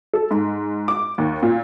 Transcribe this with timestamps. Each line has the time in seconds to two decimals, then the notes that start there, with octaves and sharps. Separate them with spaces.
0.13 A4
0.31 G#2
0.88 D6
1.18 D#2
1.43 A#2